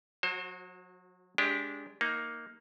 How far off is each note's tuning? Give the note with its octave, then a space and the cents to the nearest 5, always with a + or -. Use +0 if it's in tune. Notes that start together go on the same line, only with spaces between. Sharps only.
F#3 -35 F#4 +0 C5 +30
G#3 +0 D4 -20 G4 +5
A#3 +0 D#4 +10